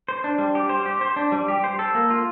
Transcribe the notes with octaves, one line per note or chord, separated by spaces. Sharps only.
C5
D4
G3
G4
C5
G4
C5
D4
G3
G4
C5
A4
A#3
F4